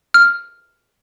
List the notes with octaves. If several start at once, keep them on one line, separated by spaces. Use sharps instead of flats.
F6